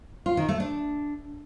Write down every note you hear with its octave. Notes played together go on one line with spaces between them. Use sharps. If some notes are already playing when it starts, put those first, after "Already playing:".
F4
D#3
A3
D4